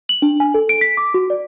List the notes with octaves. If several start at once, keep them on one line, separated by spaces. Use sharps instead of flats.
F#7
D4
G#5
A4
D7
B6
D6
F#4
D5